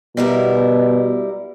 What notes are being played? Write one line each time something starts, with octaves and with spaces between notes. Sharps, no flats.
B2 G3 E4 A#4